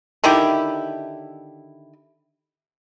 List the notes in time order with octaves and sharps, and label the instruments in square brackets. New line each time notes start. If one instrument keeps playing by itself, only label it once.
[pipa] D3 D#3 E4 G4